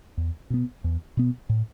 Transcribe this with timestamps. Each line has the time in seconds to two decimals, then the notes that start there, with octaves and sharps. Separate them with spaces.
0.17 E2
0.50 B2 B3
0.84 E2
1.17 B2 B3
1.49 A2